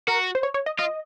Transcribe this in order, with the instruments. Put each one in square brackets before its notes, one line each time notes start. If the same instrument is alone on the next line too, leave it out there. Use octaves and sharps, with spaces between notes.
[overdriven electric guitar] F#4 [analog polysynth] A#4
[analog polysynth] C5
C#5
C#5
D#5
[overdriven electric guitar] F4 [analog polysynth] D#5